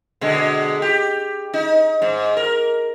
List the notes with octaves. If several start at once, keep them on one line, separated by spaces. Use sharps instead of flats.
B2 D3 G#3
G4
D#4
G#2
A#4